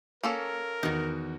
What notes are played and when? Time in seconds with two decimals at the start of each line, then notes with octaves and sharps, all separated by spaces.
0.23 A#3 C#4 A4 A#4
0.83 E2 D#3 D#4 F#4